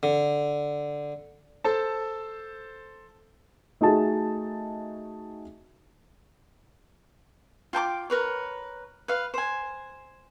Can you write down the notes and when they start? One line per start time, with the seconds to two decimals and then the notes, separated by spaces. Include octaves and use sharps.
0.03 D3
1.64 A4 C5 A5
3.81 A3 D#4 F#4 G#4 A5
7.73 F4 G5 A5 D6
8.10 A#4 B4 C#5
9.08 B4 F5
9.34 C5 G#5